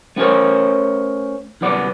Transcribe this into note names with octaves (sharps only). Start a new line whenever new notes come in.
A3 B3 C#4 A#4 C5 C#5
C2 F#2 B3 D5 F#5